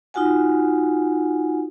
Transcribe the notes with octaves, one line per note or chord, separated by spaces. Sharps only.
D#4 F4 F#4 F#5 G#5